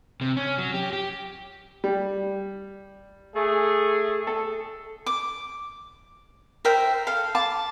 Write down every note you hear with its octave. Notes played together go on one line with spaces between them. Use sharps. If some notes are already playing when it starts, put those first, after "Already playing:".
C3
C#4
F#3
G4
G4
G3
A3 G#4
A4
D6
A#4 C5 E5 G5
A4 F5
F5 A5 D6